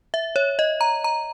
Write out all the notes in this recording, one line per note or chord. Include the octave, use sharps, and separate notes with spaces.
E5
C#5
D#5
A#5
A#5